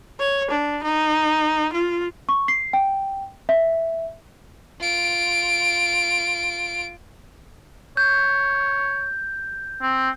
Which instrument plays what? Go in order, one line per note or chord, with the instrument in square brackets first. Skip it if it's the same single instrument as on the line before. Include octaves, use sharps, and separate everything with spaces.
[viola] C#5
D4
D#4
F4
[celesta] C#6
C7
G5
E5
[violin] F4 D7
[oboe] C#5 [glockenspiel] G6
[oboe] C4